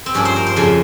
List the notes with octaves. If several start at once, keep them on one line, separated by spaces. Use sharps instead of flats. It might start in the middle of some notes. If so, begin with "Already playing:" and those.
C4
G2 F3 A#3 C#4
C5
A#4
C5
F2 C#3 F3